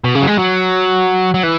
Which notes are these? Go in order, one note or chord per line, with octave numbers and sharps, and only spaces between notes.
B2
C#3
F#3
G#3
F#3
F#3
E3